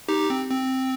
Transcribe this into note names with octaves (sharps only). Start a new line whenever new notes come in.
D#4 G4
C4
C4